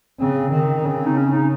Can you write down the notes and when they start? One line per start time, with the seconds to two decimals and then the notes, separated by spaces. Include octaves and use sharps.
0.19 C#3 C4
0.52 D#3
0.85 C#3
1.06 D#4
1.17 C#4
1.33 D#4